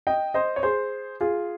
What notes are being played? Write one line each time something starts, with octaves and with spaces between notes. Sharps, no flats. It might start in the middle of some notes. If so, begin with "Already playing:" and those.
D#5 G5
C5 D#5
C#5
G#4 C5
F4 G#4